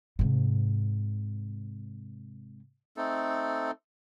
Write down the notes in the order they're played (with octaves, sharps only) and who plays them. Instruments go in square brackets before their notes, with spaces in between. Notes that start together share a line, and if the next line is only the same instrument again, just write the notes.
[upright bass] G#2 C3
[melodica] A3 C4 D#4 A4